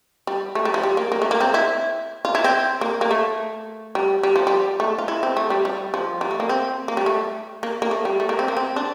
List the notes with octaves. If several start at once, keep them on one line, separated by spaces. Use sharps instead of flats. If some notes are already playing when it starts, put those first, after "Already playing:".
G3
A3
G3
F3
G3
A#3
A#3
A3
A#3
C4
E4
F4
E4
C4
A#3
A#3
A3
G3
G3
F3
G3
A3
F4
E4
C4
A3
G3
G3
F3
G3
A3
A#3
C4
A#3
G3
A3
A#3
A#3
A3
G3
A3
A#3
C4
A#3
C4
D4